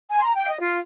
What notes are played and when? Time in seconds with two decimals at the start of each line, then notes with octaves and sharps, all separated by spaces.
0.10 G#5
0.18 C6
0.22 A#5
0.35 G5
0.44 F5
0.48 D#5
0.61 F4